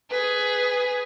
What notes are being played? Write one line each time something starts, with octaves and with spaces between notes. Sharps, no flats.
G#4 B4